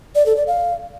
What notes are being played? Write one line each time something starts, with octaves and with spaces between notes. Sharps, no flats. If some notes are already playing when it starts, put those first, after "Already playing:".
D5
A4
D5
F5